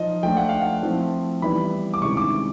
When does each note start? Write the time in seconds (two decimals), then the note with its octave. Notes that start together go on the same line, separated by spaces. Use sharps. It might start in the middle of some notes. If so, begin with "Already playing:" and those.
Already playing: F3 D#4 D#5
0.23 F3 A3 D4 G5
0.37 F#5
0.49 F5
0.61 F#5
0.83 F3 A3 C4 E4
1.42 E3 G3 B3 E4 B5
1.94 D6
2.02 C3 D#3 G#3 C#4 E4 C#6
2.17 D6